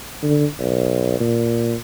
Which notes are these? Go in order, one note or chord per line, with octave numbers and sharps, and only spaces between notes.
D3
B1
A#2